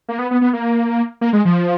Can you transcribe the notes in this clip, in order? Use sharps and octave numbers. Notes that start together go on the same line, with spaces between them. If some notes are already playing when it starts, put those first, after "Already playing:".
A#3
B3
B3
B3
A#3
A#3
G#3
F3